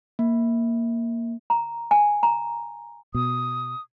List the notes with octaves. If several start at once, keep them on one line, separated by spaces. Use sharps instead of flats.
A#3
A#5
G#5
A#5
B2 D#6